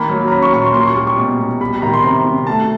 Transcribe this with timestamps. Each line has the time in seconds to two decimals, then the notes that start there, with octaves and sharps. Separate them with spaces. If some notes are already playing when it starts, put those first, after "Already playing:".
Already playing: D#3 A#3 B5
0.10 F#3
0.28 A#5
0.31 C#4 B5
0.42 C#6
0.53 A#2 C#6
0.64 C6
0.74 A#3 C6
0.85 C#6
0.96 G3 D6
1.07 C#6
1.18 B2
1.39 B2
1.61 G3 B5
1.77 B5
1.82 D#3 A#5
1.93 C6
2.04 C3 A#5
2.26 C3
2.47 A3 A5